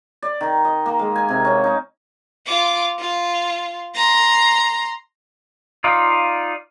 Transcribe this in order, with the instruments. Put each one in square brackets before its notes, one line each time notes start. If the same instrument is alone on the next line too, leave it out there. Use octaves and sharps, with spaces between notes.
[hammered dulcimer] D5
D#3
D#5
A#3
G#3
G#5
C3
C#4
D#4
[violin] F4 D6
F4
A#5 C6
[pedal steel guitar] D#4 F4 D5 F5